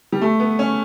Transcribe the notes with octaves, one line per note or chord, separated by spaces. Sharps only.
G3
A3
B3
C#4